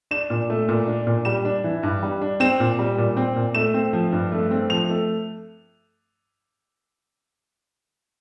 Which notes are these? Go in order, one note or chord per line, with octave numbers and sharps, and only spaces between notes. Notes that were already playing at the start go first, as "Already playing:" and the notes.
D4 E7
A#2
A3
A#2
D4
A#2
G3 E7
D4
E3
G2
G3
D4
C4 E7
A#2
G3
A#2
C4
A#2
A3 E7
C4
F3
G2
A3
C4
F3 F7
A3